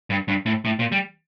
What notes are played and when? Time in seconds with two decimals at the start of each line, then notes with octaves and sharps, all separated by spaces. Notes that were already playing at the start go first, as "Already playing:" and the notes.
0.10 G2
0.28 G2
0.46 A2
0.65 A2
0.79 A#2
0.92 G3